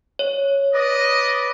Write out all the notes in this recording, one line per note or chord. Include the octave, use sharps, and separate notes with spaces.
C#5
B4 D5 D#5